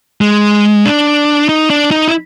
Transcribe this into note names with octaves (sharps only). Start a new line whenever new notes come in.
G#3
D4
D#4
D4
D#4
E4